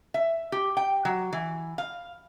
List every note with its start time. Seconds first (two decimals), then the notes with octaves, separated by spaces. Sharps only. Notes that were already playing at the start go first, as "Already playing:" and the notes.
0.14 E5
0.52 G4
0.77 G5
1.05 F#3
1.33 E3
1.78 F5